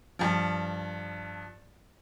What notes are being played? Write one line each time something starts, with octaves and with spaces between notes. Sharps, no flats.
G2 F3